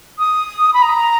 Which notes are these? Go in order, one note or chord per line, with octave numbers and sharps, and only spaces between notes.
D#6
B5
A#5